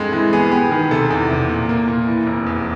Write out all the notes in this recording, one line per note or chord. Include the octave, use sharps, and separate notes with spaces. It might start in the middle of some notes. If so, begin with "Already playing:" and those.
Already playing: G2 G#3 C4 A4
E3
B3 G#4
B3 G4
D#3 G#4
C3 A4
E2
C3
A#2
A#3
A#2
E3
F1
E2